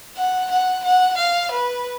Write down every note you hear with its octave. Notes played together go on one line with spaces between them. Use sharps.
F#5
F#5
F#5
F5
B4